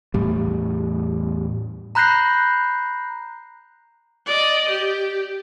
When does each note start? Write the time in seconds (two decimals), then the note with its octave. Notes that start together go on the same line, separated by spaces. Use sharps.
0.14 E2 A2 G3
1.95 A#5 B5 F#6 G6 A#6 C7
4.26 D5 D#5
4.69 G4